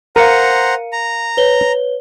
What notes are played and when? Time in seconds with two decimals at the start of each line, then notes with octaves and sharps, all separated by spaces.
0.16 A#4 C5 F5 F#5 A#5 C#7 D#7
0.93 A#5
1.37 B4 C#5 G7